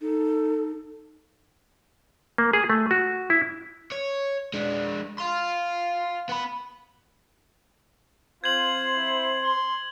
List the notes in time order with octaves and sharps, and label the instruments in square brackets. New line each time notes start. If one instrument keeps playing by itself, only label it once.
[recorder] D#4 [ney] A4
[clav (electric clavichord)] A#3
G#4
A3
F#4
E4
[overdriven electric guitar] C#5
G#3 D4
F5 C6
B3 B5
[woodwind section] C4 C5 [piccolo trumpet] F4 [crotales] G#6 F#7
[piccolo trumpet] E4
C6